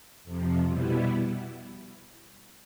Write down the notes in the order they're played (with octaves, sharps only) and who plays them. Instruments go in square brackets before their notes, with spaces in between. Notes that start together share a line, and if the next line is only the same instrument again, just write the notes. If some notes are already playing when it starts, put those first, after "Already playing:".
[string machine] F2 C3 F3
B2 G3 B3 E4